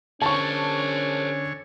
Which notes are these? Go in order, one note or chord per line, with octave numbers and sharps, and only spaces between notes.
D3 C#4 G#4 A#4 C5 C#5 A5 C#6